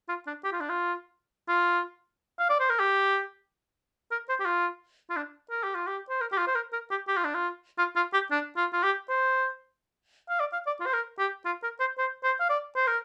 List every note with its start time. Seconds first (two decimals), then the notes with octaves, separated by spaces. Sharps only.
0.09 F4
0.27 D4
0.44 G4
0.52 F4
0.61 D4
0.69 F4
1.49 F4
2.39 F5
2.50 D5
2.60 C5
2.69 A#4
2.80 G4
4.11 A#4
4.29 C5
4.40 G4
4.45 F4
5.10 F4
5.16 D4
5.51 A#4
5.64 G4
5.75 F4
5.87 G4
6.09 C5
6.21 A#4
6.32 G4
6.38 F4
6.47 C5
6.55 A#4
6.73 A#4
6.91 G4
7.08 G4
7.17 F4
7.25 D4
7.34 F4
7.78 F4
7.96 F4
8.14 G4
8.31 D4
8.57 F4
8.73 F4
8.83 G4
9.09 C5
10.29 F5
10.40 D5
10.53 F5
10.67 D5
10.80 F4
10.86 C5
10.93 A#4
11.19 G4
11.46 F4
11.63 A#4
11.80 C5
11.98 C5
12.24 C5
12.40 F5
12.49 D5
12.76 C5
12.87 A#4